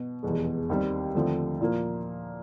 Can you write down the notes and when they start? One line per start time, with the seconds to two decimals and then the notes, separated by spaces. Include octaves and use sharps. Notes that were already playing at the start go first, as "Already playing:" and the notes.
Already playing: B2
0.23 F1 E2 B2 G#3
0.70 D#2 D#3 G3 C4
1.15 D#2 D3 F3 A3 C4
1.61 A#2 F3 A#3